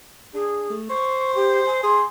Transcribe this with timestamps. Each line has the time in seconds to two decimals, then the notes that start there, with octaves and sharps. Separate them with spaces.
0.34 D4 G#4
0.70 A3
0.90 C5 C#6
1.35 G4
1.66 G#5
1.83 G#4 C6